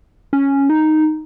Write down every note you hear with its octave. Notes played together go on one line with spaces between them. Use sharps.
C#4
D#4